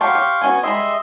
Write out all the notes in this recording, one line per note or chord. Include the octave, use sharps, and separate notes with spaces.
F#3 G4 F5 A5 C6 C#6
G4
B3 C#4 F#4 G#5
G3 G#3 D#5 E5 B5 C6